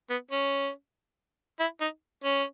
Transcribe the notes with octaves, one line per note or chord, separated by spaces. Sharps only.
B3
C#4
E4
D#4
C#4